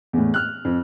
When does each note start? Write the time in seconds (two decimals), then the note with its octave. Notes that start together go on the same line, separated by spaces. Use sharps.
0.13 E2 A2
0.34 F6 F#6
0.65 F2